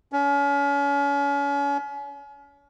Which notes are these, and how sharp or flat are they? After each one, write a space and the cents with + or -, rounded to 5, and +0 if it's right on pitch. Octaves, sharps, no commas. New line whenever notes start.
C#4 +35